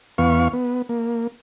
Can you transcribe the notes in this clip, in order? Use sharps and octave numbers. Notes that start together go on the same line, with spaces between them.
E2 B3 F5 C#6
B3
A#3